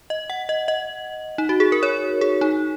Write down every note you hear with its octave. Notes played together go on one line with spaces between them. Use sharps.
D#5
F#5
D#5
D#5
D#4
F#4
G#4
A#4
C#5
G#4
D#4